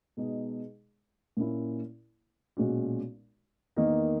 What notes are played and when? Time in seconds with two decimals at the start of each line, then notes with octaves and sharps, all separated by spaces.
0.17 B2 G#3 D#4 G#4
1.37 A#2 A#3 C#4 E4
2.57 B1 A#2 G#3 C#4 F#4
3.76 E2 D#3 A#3 D#4 A#4